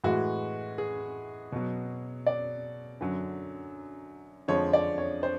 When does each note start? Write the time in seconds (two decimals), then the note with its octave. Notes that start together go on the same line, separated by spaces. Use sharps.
0.04 A2 E3 G#3 F#4
0.78 G#4
1.52 B2 F#3
2.26 D5
3.01 F#2 D3 F#3
4.48 F2 D3 F3 G#3 C#5
4.73 D5
4.98 C#5
5.23 C5